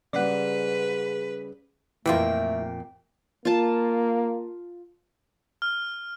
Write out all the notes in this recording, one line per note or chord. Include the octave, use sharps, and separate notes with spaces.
G#2 C#3 G3 B4 D5 F#5
F2 A#2 E3 A3 A#3 F4 G4 G5
A#3 F4 A5
F6